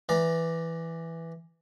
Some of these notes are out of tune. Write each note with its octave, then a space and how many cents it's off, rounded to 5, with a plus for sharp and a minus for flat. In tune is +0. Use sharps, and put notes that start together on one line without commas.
E3 +0 D5 +0 A#5 +25